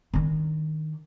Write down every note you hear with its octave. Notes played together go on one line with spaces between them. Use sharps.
D#3 D4